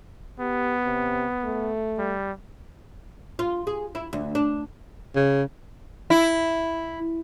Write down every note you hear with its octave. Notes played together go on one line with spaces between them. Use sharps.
B3 G4
C3
A3
G3
F4
G#4
E4
D2
D4
C#3
E4